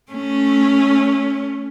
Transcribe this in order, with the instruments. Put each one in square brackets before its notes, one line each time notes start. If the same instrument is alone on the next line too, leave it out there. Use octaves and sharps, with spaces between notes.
[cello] A3 C#4